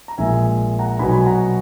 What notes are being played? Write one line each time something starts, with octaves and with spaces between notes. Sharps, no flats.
A#5
A#1 A#2 G#3 E5 G#5
F#5 A#5
B1 B2 F#3 G#5 B5
G#5 B5
F#5 A#5